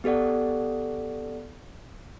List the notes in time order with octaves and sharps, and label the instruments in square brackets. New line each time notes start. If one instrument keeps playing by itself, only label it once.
[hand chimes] B3 G4 A4 D5 F#5